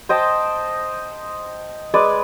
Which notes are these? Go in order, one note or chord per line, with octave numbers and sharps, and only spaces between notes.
C5 D#5 G5 A5
G#3 B4 D5